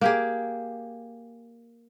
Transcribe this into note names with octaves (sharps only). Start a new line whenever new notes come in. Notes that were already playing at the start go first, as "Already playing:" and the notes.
A#3 G4 G#4